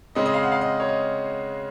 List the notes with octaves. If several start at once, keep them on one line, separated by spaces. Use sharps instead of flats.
C#3 G#3 C4 D#5
D#5
F5
F#5
F5
D#5
C#5
D#5